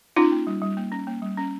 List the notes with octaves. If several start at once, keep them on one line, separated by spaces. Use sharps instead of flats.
C#4 D#4 F4
A#3
G3
G3
A#3
C#4
A#3
G3
C#4